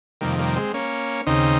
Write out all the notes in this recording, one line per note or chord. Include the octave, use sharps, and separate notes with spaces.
F2 C3 D#3 G3 A#3
G3 A#3
G#3 C4
A#3 C#4
D#2 C#3 C4 D#4